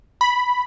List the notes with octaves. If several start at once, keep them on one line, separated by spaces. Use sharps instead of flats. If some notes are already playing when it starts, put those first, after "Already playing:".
B5